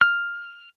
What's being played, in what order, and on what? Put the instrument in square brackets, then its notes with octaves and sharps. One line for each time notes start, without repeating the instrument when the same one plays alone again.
[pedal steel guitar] F6